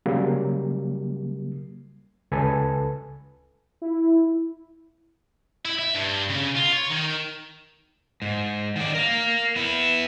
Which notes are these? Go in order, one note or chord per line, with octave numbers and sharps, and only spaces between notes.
C#3 F#3 G3 A#3
C#2 A4 B4 G#5
E4
E4
E5
G2
C#3
F4
C#5
D#3
G#2
D#3 D5
A#4 F5
B3 E4